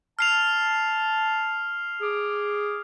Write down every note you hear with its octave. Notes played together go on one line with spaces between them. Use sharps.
A5 F6 C7 F7
G#4 D6